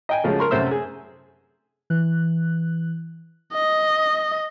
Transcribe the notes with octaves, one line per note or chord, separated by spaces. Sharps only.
D#5 G5 G#5
C#3 F3 F#3 G#3 A3
A#4 C6 C#6
F#2 C3 A3 C5 E5 E6
G#4
E3 F#6
D#5